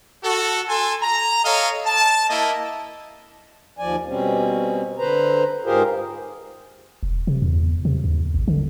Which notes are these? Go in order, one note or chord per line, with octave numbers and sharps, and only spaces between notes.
F#4 A4
A4 G#5 A5 C6
A#5
A4 C#5 D#5 F5
A5
A#3 E4 D#5
D#2 F3 D5 G#5
B2 G3 C4 C#4
D3 B4 C5 A#5
G#2 F4 G4 G#4 A#4 C5
E1
C3
E2
C3
D#2
G#1
D3